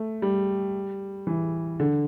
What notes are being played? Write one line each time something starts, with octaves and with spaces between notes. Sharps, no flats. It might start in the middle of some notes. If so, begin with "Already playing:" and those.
Already playing: A3
G3
E3
D3